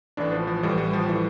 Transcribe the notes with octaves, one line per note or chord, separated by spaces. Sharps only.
A1 A2 E3 D4
F3
F3
A1 A2 E3 G3
G3
F3
A2 E3 G3